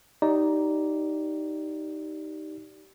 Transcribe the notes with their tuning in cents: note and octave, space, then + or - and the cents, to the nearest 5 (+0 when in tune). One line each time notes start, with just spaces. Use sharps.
D#4 +0 G4 -20 D5 -10